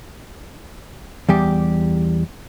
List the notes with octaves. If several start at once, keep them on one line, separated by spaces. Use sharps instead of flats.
E2 G3 G4